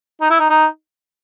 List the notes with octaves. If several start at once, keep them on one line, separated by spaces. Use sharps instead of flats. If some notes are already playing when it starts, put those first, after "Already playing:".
D#4
E4
D#4
D#4